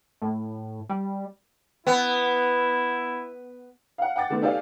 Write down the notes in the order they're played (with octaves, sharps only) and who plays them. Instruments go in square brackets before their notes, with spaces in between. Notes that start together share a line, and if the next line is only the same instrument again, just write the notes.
[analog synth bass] A2
G3
[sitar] B3 [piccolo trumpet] E4
[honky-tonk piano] F5 F#5
F#5 G5 D6 A6
D#3 A3 B3 C4
D#4 G4 A4 D5 F5 G#5